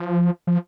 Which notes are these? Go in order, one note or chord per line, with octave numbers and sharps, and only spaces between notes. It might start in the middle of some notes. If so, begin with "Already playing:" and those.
Already playing: F3
F3